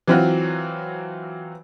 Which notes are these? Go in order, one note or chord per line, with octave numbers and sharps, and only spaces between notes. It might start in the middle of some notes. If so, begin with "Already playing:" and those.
E3 F#3 C4 F4 F#4